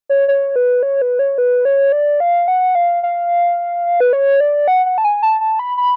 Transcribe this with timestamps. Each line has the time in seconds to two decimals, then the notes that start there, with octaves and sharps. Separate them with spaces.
0.09 C#5
0.28 C#5
0.56 B4
0.83 C#5
1.02 B4
1.19 C#5
1.38 B4
1.65 C#5
1.92 D5
2.20 F5
2.48 F#5
2.75 F5
3.03 F5
4.00 B4
4.13 C#5
4.40 D5
4.68 F#5
4.86 F#5
4.98 A5
5.04 G#5
5.23 A5
5.41 A5
5.59 B5
5.78 B5